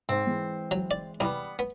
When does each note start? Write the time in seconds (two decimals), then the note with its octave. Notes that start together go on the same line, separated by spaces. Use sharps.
0.09 G#2 C4 C5
0.27 E3 G#3
0.71 F#3
0.91 D5
1.20 C2 G3 B3
1.59 B3